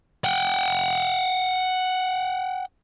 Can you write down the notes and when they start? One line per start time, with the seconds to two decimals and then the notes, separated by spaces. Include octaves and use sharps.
0.24 F#5 G5